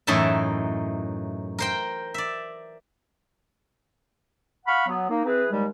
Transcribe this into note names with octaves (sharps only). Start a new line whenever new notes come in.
F#2 A2 E3 D#4 E5 A5
A#4 C5 G5
D5 E5
F5 F#5 B5 C#6 F6
F#3 B3
A#3 D#4
E3 C4 G#4 B4
D#2 G3 G#3